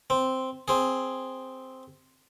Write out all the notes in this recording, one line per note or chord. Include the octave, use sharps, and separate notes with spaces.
C4
C4 G#4